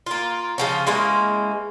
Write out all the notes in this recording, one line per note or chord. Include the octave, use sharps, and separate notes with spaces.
A#3 F4
C#3 F3 C#4
E3 G#3 A#3 C#4